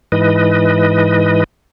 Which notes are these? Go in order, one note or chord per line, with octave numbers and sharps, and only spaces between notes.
G#2 E3 B4 D#5